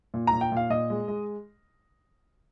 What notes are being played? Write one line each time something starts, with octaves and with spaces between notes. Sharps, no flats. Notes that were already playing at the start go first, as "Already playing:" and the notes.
A#2
A#5
A#2
G5
A#2 F5
A#2 D#5
G#3
G#3